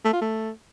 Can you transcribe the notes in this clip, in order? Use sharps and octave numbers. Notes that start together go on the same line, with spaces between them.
A3
F4
A3